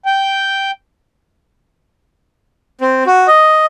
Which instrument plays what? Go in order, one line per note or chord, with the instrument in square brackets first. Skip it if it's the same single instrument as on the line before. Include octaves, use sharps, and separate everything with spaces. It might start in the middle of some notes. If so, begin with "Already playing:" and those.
[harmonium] G5
[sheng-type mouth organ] C4
F#4
D#5